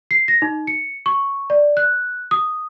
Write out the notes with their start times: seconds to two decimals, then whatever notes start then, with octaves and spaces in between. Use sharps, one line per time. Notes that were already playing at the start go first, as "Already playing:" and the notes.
0.11 C7
0.28 A#6
0.42 D#4
0.67 C#7
1.06 C#6
1.50 D5
1.77 F#6
2.31 D#6